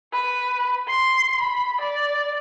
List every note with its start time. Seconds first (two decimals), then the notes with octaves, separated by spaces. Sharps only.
0.12 B4
0.88 C6
1.40 B5
1.80 D5